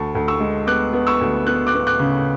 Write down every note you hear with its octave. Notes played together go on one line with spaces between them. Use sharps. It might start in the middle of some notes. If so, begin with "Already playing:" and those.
Already playing: D2 A5 C#6
D2
C#6 E6
G#3
B3 D6 F#6
B3
C#6 E6
D2
B3 F#6
D6 F#6
B3
D6 F#6
C#3